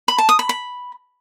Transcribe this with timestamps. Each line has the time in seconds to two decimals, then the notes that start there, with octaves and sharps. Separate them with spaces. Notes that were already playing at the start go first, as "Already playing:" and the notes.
0.08 B5
0.18 A5
0.29 D#6
0.39 B5
0.49 B5